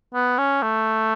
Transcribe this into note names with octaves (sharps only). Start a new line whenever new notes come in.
B3
C#4
A3